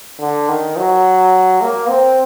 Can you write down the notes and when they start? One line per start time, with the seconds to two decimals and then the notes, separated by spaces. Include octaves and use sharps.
0.20 D3
0.48 D#3
0.77 F#3
1.62 A#3
1.89 C4